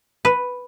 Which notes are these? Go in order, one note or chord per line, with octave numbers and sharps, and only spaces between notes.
B4